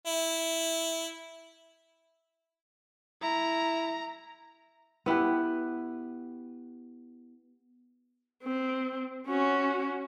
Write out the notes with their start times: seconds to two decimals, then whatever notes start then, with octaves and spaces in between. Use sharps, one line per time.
0.06 E4
3.23 E4 A#5
5.06 B3 E4 G4 B4
8.43 C4
9.27 C#4 F#4